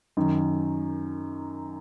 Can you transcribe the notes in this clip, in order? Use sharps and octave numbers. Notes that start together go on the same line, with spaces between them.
F#2 D#3